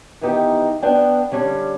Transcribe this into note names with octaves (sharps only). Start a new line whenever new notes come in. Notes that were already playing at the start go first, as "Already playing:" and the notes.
D#3 E3 B3 D#4 G4
B3 D4 G5
D3 G3 C#4 D4